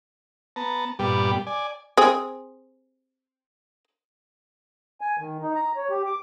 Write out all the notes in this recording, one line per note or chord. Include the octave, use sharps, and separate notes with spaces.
B3 A5 A#5
G2 A#2 G3 B3 G4
D5 G#5
C4 G#4
G#5
D#3
D#4
A#5
C#5
G4
D6